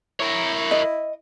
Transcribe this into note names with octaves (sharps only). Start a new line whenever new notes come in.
E4 A#4 C#5
D#5